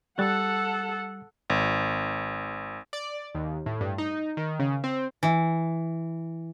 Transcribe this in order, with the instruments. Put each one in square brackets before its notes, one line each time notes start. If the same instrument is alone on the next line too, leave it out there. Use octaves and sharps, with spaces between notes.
[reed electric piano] G3 F#6 A6 [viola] A4 F#5
[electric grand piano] G#1
[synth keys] D5
D#2
A2
G2
D#4
D#3
C#3
C4
[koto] E3